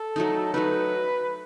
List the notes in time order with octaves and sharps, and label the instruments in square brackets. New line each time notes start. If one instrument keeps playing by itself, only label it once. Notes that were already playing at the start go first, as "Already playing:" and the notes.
Already playing: [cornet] A4
[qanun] F#3 A3 D#4
[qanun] F#3 A3 D#4 [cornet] B4